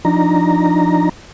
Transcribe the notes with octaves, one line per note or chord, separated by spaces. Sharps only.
F3 D4 D#4 A#5